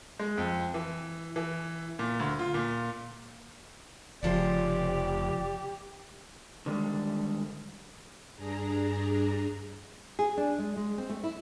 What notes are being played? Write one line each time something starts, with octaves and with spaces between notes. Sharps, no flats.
G#3
F2
E3
E3
A#2
D2
F4
A#2
F1 C#3 F3 G4 C5 D5
D3 D#3 G3 G#3
G2 D4 G#4 A#5
G#4
D4
G#3
G#3
C4
A3
E4